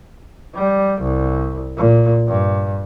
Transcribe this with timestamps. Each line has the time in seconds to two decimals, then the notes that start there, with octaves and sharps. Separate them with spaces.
0.55 G3
1.02 C2
1.77 A#2
2.28 G2